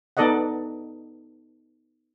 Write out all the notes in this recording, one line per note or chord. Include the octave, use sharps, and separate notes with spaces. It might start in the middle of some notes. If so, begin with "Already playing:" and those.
B3 D#4 A4 D5 D#5 F#5